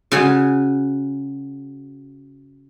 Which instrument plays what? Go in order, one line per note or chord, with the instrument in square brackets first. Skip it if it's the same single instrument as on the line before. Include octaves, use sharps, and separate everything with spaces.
[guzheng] C#3 F#4 G#5